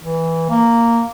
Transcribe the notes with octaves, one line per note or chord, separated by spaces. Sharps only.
E3
A#3